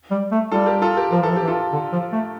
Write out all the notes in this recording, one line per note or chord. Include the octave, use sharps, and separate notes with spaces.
G3
A3
G3 F4 A4
G4 A#4
F4 A4
G4 A#4
F3 A#4
E3 A4
F3
G4
E3
F4 A4
D3
F3
A3